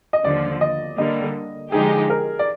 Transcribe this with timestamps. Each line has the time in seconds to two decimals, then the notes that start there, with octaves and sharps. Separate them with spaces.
0.13 D#5
0.24 D#2 D3 F3 D5
0.61 D#5
0.98 D3 G3 A#3 D#5
1.72 D3 F3 G#3 D#4 G4 G#4
2.10 A#4
2.39 D5